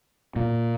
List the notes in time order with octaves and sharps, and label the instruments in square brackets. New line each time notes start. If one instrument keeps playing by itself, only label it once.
[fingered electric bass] A#2